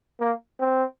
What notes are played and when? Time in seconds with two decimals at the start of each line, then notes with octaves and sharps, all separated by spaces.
0.20 A#3
0.60 C4